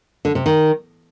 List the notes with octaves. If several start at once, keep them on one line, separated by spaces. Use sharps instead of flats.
D3
C3
D#3